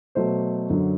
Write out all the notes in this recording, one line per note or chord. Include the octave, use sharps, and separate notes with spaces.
B2 F#3 A3 C5
F#2 D3 F#3